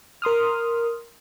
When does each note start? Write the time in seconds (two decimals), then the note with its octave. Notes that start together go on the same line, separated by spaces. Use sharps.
0.22 A#4 C6 D#6 F6